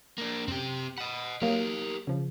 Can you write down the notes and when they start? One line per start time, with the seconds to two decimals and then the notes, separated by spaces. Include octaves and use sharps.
0.18 A#3 D4
0.48 F#2 C4 G4
0.98 D#5 F#5 B5 E7
1.42 F#3 A#3 G4 A#4
2.07 C#3 F3